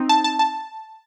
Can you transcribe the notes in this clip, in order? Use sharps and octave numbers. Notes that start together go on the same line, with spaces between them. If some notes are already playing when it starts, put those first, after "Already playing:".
Already playing: C4 D#4
A5
A5
A5